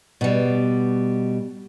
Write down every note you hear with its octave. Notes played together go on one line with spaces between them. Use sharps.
B2 G3